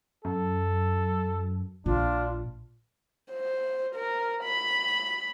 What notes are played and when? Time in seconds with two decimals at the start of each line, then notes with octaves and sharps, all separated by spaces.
0.25 F#2 A4
1.86 A#1 D4 F4
3.32 C5
3.95 A#4
4.44 B5